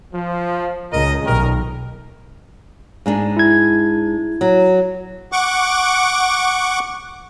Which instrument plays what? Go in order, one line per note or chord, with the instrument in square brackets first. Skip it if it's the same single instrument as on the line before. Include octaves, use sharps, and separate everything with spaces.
[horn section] F3
[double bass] C#2 [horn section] A#4 D#5
[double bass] B1 B2 [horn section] G2 D#3 A#4
[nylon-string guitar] G#2 G#3 D4
[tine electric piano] E4 G#6
[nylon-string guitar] F#3
[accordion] F#5 C#6 D6